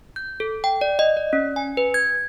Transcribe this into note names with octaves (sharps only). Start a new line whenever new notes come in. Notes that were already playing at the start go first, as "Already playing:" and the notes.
G6
A4
G5
D5
D#5
D5
C#4
G#5
B4
G#6